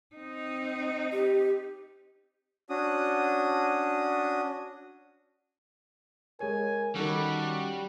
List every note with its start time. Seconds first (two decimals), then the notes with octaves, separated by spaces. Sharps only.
0.15 C4 D#4
1.12 G4
2.69 C#4 D4 F#4 D#6
6.40 G#3 A#4 C#5 G#5
6.96 D#3 G3 C#4 F#4 A4